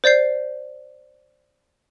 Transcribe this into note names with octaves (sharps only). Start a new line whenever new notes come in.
C5 D5 G6 C7